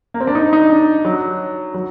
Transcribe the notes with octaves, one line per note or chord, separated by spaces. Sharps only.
A#3
C4
D4
D#4
D#4
D4
F#3
F#3